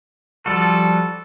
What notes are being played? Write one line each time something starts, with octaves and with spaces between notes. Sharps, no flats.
F3 G3 F#4 A4